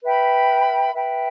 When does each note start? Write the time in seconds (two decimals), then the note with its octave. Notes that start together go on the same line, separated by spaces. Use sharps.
0.04 B4 E5 G5 B5
0.93 B4 E5 G5 B5